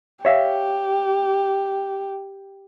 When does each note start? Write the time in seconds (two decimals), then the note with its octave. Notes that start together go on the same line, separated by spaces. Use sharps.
0.25 G4 C#5 E5 F5